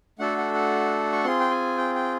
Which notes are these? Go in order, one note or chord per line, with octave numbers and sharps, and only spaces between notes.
A3 D4 F#4 A4 F#5
F#5
F#5
C#6
C4 F4 G#4 C6
G5
G#5
G5
G5